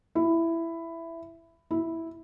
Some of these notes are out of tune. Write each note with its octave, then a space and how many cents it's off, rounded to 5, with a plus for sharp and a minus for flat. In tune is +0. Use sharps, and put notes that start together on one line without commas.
E4 +10
E4 -5